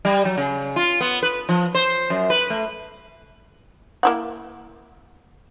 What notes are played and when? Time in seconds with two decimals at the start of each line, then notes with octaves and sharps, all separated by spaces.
0.05 G3
0.25 F#3
0.38 C#3
0.76 F4
1.01 B3
1.23 B4
1.49 F3
1.75 C5
2.10 F#2
2.30 B4
2.50 A3
4.03 A#3 E4 F#5